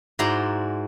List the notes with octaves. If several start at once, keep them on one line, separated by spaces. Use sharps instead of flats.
G#2 E4 F#4 D5 A#5 C6